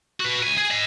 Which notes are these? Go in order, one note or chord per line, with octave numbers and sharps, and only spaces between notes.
F#4 B4
C#2 G#5
G#4
D#5 B5